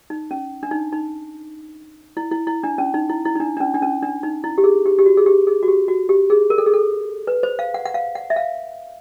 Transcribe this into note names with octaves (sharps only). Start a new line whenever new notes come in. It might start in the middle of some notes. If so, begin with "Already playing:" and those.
D#4
C#4
D4
D#4
D#4
E4
E4
E4
D4
C#4
D#4
E4
E4
D#4
D4
D4
C#4
D4
C#4
D4
D#4
E4
G4
G#4
G4
G4
F#4
G#4
G4
G#4
F#4
G4
F#4
G4
G#4
A#4
A4
G#4
A4
B4
C5
F5
F#5
F#5
F5
F#5
E5
F5